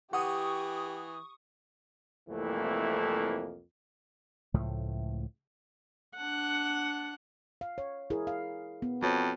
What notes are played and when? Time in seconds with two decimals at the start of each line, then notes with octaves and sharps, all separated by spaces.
0.13 E3 G4 F#5 C#6 D#6
2.30 C2 F2 E3 A3 A#3
4.54 C#2 A2 F3 A3
6.17 D4 F#5
7.61 F5
7.78 C#5
8.10 E4 G#4 A#4
8.27 F5
8.82 B3
9.03 F2 F#4 B4 C#5